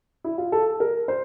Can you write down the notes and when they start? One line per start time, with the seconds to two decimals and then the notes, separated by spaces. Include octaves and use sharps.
0.24 E4
0.38 F4
0.52 A4
0.80 A#4
1.08 C5